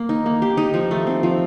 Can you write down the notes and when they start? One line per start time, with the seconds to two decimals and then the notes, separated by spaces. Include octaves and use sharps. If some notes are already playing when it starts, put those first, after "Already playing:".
Already playing: A#3
0.09 D#4
0.26 A#3
0.42 G4
0.57 D#4
0.74 F3
0.91 A3
1.07 C4
1.23 F3